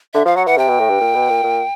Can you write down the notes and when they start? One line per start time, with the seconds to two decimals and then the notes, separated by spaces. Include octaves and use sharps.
0.14 D3 E5
0.25 F3 F5
0.36 F#3 F#5
0.47 E3 F#5
0.58 C3 G5
0.68 B2
0.79 A2
0.90 G2
1.01 A#2
1.15 B2
1.30 A#2
1.44 A#2